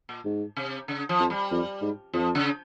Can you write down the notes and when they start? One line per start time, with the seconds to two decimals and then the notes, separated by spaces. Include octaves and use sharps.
0.09 A#2
0.25 G#2
0.56 C3
0.88 C#3
1.09 F3
1.19 F2
1.30 G3
1.51 F2
1.82 G#2
2.13 F2 F3
2.35 C#3